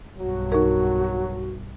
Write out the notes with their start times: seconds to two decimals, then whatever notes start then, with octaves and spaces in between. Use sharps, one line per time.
0.18 B1 G2 F#3 F#4
0.52 D#4 A#4